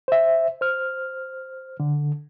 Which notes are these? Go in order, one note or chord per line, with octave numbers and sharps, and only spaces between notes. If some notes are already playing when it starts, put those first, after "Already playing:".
C5 E5
C5 F6
D3